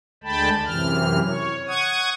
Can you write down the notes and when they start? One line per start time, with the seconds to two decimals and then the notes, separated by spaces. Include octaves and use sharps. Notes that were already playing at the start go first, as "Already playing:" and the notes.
0.24 D2 D3 G#3 G5 A5 B5
0.66 F#2 C3 E3 F6
1.25 C#5
1.68 F#5 C#6 D#6 G#6